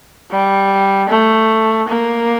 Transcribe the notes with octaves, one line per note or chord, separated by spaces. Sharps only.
G3
A3
A#3